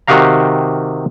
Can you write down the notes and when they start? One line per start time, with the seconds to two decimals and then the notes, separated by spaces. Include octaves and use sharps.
0.08 C3 D#3 F#4 G4 F5 A#5